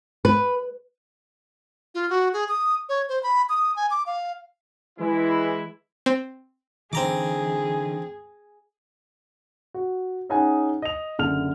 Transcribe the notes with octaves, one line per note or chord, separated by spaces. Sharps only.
B4
F4
F#4
G#4
D#6
C#5
C5
B5
D#6
G#5
D6
F5
E3 G#3 E4
C4
D3 E3 C4 G#4 A#5 D6
F#4
C#4 D#4 G#4 F#5 G#5
D#5 F7
F#1 D3 F6 F7